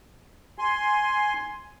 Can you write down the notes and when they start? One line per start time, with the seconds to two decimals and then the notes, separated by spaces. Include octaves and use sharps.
0.58 G#5 C6